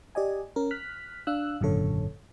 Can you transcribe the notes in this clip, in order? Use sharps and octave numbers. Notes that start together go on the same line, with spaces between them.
G4 D5 D#5 G#5
C#4 A#4
F6 F#6 B6
D4 F5 E6 F#6
G#1 F#2 A#2 D3 A4 C#5